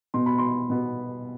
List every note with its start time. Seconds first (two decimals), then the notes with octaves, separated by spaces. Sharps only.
0.14 B2 B3 C6
0.26 B5
0.38 C6
0.70 B2 B3